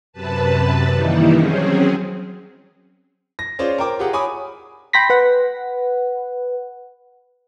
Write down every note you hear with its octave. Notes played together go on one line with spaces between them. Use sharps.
F#2 C3 B4 A5
D#3 E3 G3 A#3 D#4 E4
F#3 C4 C#4 G#4
A#6
C#4 F4 G#4 C5 D5
A#4 C5 G5 D6
F4 G4 G#4 F#5
C#5 G#5 B5 D6 D#6
G5 B5 C6 A#6 B6
B4 F#5